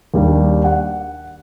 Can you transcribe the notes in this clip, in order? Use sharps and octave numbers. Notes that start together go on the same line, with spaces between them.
D#2 G3 D4
F#5